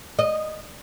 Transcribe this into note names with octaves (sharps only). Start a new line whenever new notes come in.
D#5